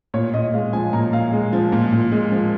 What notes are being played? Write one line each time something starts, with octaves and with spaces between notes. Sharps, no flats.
A#2 C#5
A#2 D#5
G#3 F5
F3 G#5
A#2 A#5
A#2 F5
G#3
F3
A#2
A#2
G#3
F3